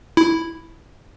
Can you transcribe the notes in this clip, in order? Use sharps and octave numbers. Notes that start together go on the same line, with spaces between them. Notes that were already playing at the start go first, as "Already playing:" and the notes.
E4